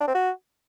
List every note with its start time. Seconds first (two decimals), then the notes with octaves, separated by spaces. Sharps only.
0.01 D4
0.08 C4
0.14 F#4